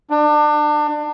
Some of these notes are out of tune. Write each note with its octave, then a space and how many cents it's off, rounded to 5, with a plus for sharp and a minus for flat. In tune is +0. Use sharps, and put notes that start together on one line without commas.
D4 +30